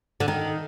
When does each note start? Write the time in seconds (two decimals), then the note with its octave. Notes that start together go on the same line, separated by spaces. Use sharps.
0.20 D3
0.28 D#3